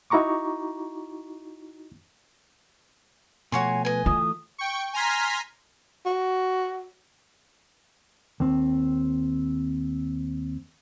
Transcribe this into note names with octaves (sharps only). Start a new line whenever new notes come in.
D#4 E4 F#4 A#5 C#6 D6
B2 F3 A3 F#4 C#5 G#5 C6
B4 D#5 G#5
E3 A3 F4 D#6
G5 C#6
G#5 A#5 C6 F6 B6
F#4
D#2 C4